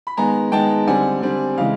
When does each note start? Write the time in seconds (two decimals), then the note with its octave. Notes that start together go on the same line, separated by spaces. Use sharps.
0.07 B5
0.17 D#3 G#3 B3 G#5 A#5
0.52 D#3 G#3 B3 G5 A5
0.87 D3 G3 C4 F#5 G#5
1.22 D3 G3 C4
1.57 C#3 E3 G#3 F5